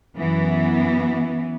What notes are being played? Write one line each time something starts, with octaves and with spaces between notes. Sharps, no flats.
F#2 E3 B3